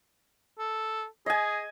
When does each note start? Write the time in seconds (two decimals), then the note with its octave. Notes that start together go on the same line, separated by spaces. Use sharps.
0.58 A4
1.26 G#4 D#5 G#5